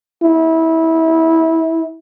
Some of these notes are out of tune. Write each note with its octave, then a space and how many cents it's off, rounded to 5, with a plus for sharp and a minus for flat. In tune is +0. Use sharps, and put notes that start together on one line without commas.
E4 -25